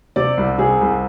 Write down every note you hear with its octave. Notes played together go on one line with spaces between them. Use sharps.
C3 D5
C2
C3 G#4
C2